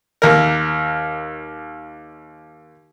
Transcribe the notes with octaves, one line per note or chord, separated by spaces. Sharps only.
D#2 A#4